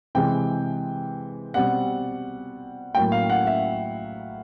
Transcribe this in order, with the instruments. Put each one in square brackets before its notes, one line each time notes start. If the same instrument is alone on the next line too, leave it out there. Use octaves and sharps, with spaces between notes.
[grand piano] C3 E3 G#3 C4 G5
B2 G3 C4 F#5
A2 F#3 A#3 G5
F5
F#5
E5